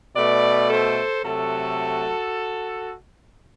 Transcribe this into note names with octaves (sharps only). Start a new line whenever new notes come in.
B2 A3 B4 D5
A4 C5
C3 F#3 A3 F#4 A4